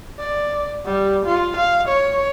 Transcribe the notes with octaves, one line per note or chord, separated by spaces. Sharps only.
D5
G3
F4
F5
C#5